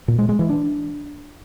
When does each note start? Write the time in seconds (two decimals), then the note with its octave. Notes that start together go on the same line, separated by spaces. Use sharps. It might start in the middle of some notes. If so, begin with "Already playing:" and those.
0.08 A#2
0.18 G#3
0.29 G#3
0.39 E3
0.49 D4